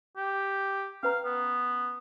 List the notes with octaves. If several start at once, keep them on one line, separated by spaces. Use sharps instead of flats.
G4
C#4 B4 F5 A#5
B3